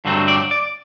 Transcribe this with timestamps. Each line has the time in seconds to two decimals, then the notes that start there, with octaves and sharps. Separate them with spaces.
0.05 G2 D3 F#3 A3 C4
0.28 D5
0.51 D5